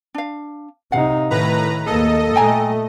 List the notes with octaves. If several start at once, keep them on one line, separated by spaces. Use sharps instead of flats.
D4 F5
C3 D#4 F5 F#5
A2 D#3 B4 A#5
D#2 A#3 G#4 A4 D#5
A#2 A3 G5 G#5 A#5